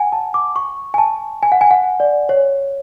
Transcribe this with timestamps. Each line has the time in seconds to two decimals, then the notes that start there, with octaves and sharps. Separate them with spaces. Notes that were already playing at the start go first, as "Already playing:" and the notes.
Already playing: F#5 G#5
0.12 A5
0.34 D6
0.56 C#6
0.94 G#5
0.98 A5
1.43 G#5
1.52 F#5
1.61 G#5
1.71 F#5
2.00 D5
2.29 C#5